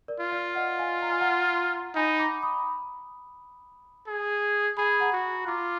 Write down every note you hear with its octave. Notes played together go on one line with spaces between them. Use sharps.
A#4 D5
F4
D5 F5
D#5 F#5
F5 G#5
A#5
G#5
F#5 A#5
D#4 G#5 B5
A#5 D6
B5 D#6
G#4
G#4 G#5 B5
F#5 A#5
F#4
F4 A#5 D6